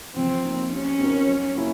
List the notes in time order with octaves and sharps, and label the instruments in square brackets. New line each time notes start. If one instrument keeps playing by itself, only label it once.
[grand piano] F3 [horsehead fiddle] C4
[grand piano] A#3 D#4
[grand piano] G3 [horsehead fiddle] C#4
[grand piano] C4 D#4 F#4 A#4
F#3
A#3 C#4 E4